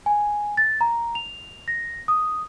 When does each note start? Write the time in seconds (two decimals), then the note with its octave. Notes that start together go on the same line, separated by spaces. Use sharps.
0.06 G#5
0.57 A6
0.81 A#5
1.15 F7
1.68 A#6
2.08 D#6